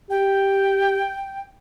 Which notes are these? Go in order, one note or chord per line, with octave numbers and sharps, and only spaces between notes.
G4 G5